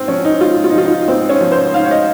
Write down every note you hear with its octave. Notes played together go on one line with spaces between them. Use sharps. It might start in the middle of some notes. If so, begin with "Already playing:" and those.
Already playing: G#2 C4
F3 C#4
D#4
G#2 F4
F4
D#4
F3 F4
D#4
G#2 C4
C#4
F3
C5
G#2 F5
C#5
D#5